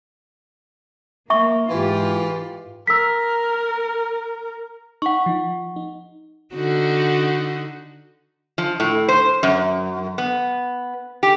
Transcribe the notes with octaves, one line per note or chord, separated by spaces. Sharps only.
A#3 E5 C#6
G#2 E3 F4 G4
A#4 E6 B6
D#4 F#5 C#6
F3 D#4
D#4
D3 D#4 F#4
F3
A2
C5
F#2
B3
G4